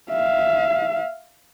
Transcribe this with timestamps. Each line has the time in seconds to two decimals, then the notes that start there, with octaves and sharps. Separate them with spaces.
0.11 E5 F5